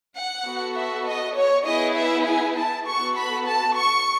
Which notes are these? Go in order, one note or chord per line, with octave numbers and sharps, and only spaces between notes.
F#5
B3 F#4 A4
E5
D#5
C#5
B3 E4 G#4 D#5
E5
G#5
A5
B3 F#4 A4 C#6
B5
A5
C#6